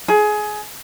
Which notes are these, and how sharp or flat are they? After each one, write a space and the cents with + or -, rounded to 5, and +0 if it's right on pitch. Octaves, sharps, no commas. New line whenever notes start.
G#4 +20